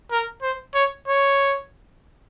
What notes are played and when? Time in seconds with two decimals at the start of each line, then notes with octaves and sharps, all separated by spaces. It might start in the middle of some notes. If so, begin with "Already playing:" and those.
0.11 A#4
0.42 C5
0.75 C#5
1.08 C#5